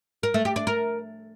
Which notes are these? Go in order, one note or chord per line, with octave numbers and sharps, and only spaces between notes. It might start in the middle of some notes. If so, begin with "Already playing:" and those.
A#4
A3
G4
D4
A#4